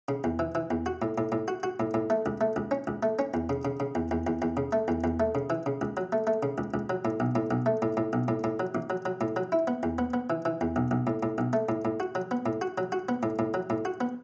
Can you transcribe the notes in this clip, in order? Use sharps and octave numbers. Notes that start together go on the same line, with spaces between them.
C#3
E2
E3
E3
E2
F#4
A2
A2
A2
F#4
F#4
A2
A2
A3
C#2
A3
C#2
C#4
C#2
A3
C#4
E2
C#3
C#3
C#3
E2
E2
E2
E2
C#3
A3
E2
E2
A3
C#3
E3
C#3
C#2
F#3
A3
A3
C#3
C#2
C#2
F#3
A2
B1
A2
B1
A3
A2
A2
B1
A2
A2
F#3
A1
F#3
F#3
A2
F#3
E4
B3
E2
B3
B3
E3
E3
E2
B1
B1
A2
A2
B1
A3
A2
A2
F#4
F#3
B3
A2
F#4
F#3
F#4
B3
A2
A2
F#3
A2
F#4
B3